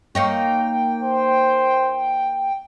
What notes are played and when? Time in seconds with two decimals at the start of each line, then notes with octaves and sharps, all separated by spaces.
0.15 A#3 D#4 C#5 G5
1.03 C5